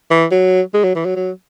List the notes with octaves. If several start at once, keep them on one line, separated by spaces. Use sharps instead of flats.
E3
F#3
G#3
F#3
E3
F#3
F#3